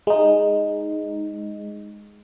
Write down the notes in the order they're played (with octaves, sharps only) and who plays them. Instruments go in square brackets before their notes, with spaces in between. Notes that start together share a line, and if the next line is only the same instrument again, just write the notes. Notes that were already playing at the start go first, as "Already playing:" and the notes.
[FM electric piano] G#3 D#4